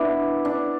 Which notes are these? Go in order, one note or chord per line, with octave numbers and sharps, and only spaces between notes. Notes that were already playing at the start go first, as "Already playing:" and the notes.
Already playing: B3 D4 E4
D4